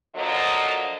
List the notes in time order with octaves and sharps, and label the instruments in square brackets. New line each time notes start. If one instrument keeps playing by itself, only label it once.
[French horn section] D3 F3 F#3 A#3 D#5